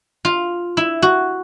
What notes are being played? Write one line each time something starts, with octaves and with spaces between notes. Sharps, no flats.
F4
E4
F#4